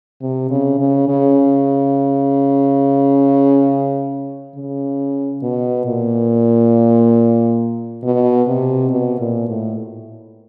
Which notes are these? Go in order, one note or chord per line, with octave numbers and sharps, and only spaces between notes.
C3
C#3
C#3
C#3
C#3
B2
A#2
B2
C3
B2
A#2
A2